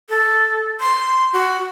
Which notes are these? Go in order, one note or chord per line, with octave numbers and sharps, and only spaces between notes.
A4
C6
F#4